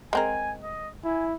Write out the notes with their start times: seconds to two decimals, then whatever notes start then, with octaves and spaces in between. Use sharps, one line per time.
0.13 G#3 C4 A#4 G#5
0.63 D#5
1.04 E4 G#5